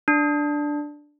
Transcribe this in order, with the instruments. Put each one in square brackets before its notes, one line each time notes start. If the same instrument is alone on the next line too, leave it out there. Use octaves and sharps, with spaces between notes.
[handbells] D4